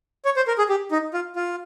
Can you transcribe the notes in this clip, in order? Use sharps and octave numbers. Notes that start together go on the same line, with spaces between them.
C#5
C5
A#4
G#4
G4
D#4
F4
F4